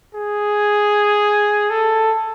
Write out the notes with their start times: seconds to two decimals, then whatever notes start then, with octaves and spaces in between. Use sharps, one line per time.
0.15 G#4
1.70 A4